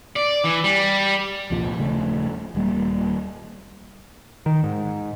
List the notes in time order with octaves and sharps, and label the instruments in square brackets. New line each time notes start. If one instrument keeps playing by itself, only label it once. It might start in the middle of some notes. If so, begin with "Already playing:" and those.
[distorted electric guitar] D5
E3
G3
[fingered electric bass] C2 F2 A#2 F3
D#1 C#3 F3 A3
D#1 G3 A#3
[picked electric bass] D#3
G#2